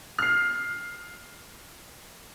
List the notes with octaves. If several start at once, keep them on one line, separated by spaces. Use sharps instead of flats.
F6 C7